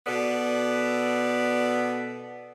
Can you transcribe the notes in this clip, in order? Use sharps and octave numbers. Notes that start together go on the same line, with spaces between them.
B2 B3 A4 D5